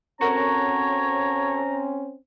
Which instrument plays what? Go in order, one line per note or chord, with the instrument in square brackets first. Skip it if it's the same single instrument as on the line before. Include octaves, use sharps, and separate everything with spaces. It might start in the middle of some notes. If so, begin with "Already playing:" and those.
[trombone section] C4 C#4 [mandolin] F#4 A4 A#4 [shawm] C#5 [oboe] A#5